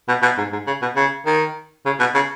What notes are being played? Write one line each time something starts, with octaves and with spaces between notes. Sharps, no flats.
B2
B2
G#2
G#2
C#3
B2
C#3
D#3
C#3
B2
C#3